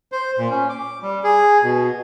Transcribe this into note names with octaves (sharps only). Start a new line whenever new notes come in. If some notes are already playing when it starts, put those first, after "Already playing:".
C5
A#2
C#4
D6
G3
G#4
B2